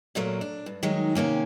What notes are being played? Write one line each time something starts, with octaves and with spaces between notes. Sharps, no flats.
A#2 F#3 A3 A#3
D4
G2
D#3 F#3 G#3 D#4
C3 D#3 A#3 C#4